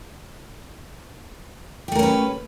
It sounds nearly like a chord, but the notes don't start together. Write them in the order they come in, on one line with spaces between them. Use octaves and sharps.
G4 A3 A#4 C#4 B4